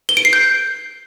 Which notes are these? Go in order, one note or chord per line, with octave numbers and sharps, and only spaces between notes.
G7
D7
C7
G6